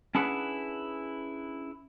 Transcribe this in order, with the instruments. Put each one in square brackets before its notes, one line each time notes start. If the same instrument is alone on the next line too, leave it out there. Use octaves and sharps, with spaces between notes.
[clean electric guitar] C#4 D4 E4 G#4 B4 F#5